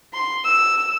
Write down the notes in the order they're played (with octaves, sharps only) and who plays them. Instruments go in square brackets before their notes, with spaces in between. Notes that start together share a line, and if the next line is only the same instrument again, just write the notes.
[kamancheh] C6
E6